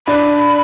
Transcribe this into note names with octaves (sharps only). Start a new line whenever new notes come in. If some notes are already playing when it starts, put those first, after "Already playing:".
D4 B5